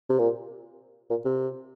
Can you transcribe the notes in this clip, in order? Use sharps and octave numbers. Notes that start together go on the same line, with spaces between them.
C3
A#2
A#2
C3